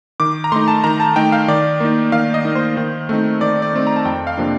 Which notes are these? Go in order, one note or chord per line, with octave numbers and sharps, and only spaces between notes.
D#3 D6
A#5
A3 D#4 C6
A5
D#3 A#5
A5
A3 D#4 G5
F5
D#3 D5
A#3 D#4
D#3 F5
D#5
A#3 D#4
C5
D#3
A3 C4 D#4
D#3 D5
D5
A3 C4 D#4
A#5
A5
F2 G5
F5
C3 F3 A#3 D4